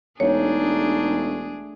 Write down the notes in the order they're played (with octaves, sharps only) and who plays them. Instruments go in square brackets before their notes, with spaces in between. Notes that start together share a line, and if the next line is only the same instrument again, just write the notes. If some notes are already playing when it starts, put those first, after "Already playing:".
[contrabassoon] E1 [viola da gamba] A3 D4 G#4 [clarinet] D#4 [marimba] C#5